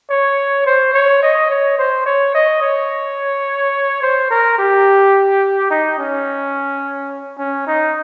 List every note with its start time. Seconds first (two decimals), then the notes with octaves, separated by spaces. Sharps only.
0.10 C#5
0.67 C5
0.94 C#5
1.23 D#5
1.50 C#5
1.79 C5
2.06 C#5
2.35 D#5
2.62 C#5
4.02 C5
4.30 A#4
4.59 G4
5.70 D#4
5.99 C#4
7.39 C#4
7.67 D#4